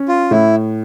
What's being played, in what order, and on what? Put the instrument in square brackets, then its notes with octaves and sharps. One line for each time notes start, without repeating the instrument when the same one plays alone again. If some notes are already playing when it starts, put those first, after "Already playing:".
Already playing: [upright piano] C#4
[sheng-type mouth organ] F4
[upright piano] A2 [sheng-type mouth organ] E4